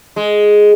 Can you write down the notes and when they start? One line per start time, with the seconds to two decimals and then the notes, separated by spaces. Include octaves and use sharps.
0.16 G#3